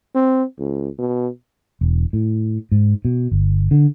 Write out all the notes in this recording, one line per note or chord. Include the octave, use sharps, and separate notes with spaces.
C4
C#2
B2
E1
A2
G#2
B2
G1
D3